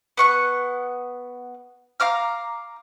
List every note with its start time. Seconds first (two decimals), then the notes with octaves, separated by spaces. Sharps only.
0.17 B3 C#6 F#6
2.00 F5 A#5 D6 F6